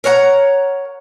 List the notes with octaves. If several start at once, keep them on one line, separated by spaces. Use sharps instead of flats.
A#4 C#5 F#5 A#5